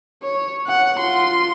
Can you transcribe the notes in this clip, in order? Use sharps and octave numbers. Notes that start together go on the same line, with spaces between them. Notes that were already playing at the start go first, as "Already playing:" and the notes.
C#5
F#5
F4 C6